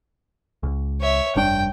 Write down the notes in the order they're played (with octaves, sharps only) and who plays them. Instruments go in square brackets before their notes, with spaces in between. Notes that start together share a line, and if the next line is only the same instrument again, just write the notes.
[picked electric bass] C#2
[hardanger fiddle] C#5 E5
[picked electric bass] F1 G2 D4 [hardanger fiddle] G5